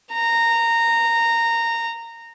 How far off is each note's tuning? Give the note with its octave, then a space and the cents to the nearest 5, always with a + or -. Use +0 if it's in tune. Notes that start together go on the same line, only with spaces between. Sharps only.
A#5 -15